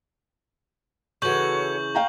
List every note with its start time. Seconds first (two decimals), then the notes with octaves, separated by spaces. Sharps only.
1.22 C#3 E3 F#4 A4 C#5 C#6 G6 F#7
1.95 F5 G5 A#5